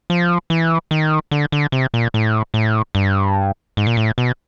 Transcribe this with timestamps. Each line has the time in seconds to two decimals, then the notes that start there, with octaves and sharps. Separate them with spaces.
0.10 F3
0.50 E3
0.91 D#3
1.31 D3
1.52 D3
1.72 C3
1.94 A#2
2.14 A2
2.54 A2
2.95 G2
3.77 G#2
3.87 A#2
3.97 A2
4.18 B2